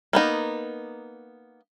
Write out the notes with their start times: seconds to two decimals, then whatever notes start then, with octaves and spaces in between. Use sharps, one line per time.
0.13 A#3 B3 D#4